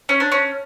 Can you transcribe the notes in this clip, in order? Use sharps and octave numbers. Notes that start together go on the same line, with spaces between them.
C#4
D4
C#4